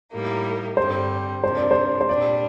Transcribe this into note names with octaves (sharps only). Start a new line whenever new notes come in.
A2 G3 A#3 D#4
G2 D3 G3 C4 C5
C3 F3 A#3 D4 C5
D5
C5
C5
A#2 G3 D4 D5